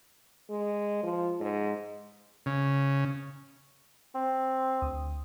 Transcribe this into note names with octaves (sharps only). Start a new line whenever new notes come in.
G#3
F3
G#2
C#3
C4
D2 D#6